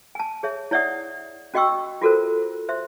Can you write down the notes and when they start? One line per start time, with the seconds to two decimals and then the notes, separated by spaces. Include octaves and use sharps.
0.15 G#5 A5
0.43 G#4 C#5 E5
0.71 E4 C#5 D5 E5 F#5 D#6
1.54 C#4 F#4 D#5 G5 C#6 E6
2.01 F4 F#4 A4 A#4 C5
2.69 C5 E5 C6